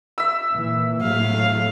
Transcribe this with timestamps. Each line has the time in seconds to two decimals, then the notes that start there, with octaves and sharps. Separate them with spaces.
0.18 E5 E6
0.53 A#2 E3
1.02 A2 F#3 A3 F5